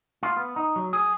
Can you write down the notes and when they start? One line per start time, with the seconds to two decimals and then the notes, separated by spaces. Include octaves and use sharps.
0.23 F4
0.37 B3
0.56 D#4
0.76 F#3
0.93 G#4